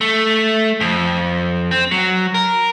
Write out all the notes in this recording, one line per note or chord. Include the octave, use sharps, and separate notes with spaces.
A3
F2
C4
F#3
A#4